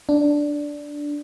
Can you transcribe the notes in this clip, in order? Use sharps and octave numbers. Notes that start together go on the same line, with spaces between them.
D4